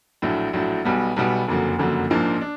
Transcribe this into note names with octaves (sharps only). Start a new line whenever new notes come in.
A#1 A2 F#3
A#1 A2 F#3
B1 B2 G3 B3
B1 B2 G3 B3
F#1 F2 D3 F#3 A#3
F#1 F2 D3 F#3 A#3
A#1 G#2 F3 A#3 D4
D4